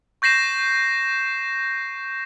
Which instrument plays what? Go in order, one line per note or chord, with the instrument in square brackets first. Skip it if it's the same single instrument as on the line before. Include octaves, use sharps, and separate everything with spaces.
[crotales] C#6 G6 A#6 C7 E7